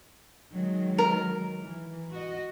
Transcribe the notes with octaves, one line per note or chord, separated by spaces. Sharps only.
D#3 F#3 G#3
A#4
E3
F#4 D#5